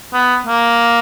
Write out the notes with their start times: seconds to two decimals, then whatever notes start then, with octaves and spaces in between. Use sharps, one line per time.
0.13 B3
0.47 A#3